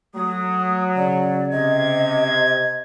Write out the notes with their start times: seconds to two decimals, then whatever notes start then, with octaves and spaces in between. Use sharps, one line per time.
0.15 F#3 A3 D#6
0.96 C#3 D5
1.51 C3 D#5 G#6